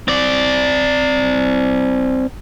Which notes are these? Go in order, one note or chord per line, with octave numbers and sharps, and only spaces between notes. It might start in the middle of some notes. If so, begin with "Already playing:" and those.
C4 D5